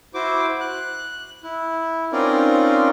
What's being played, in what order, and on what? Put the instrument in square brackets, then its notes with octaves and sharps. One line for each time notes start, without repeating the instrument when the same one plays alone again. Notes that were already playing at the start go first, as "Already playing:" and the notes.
[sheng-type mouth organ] E4 F#4 C5 D6
F#6
E4
C4 C#4 D#4 F4 A#4 D5